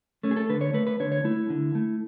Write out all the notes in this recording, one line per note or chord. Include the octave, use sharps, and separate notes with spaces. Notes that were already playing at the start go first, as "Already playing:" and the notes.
A3 C#4
G#4
A4
D3 B4
C#5
A3 B4
B4
D3 C#5
C#5
A3 E4
D3
A3